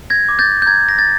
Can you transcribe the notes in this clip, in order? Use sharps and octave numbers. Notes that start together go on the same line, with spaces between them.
G#6 A#6
D6 G6
G6 A6
G6
A#5 G#6
A#6
A6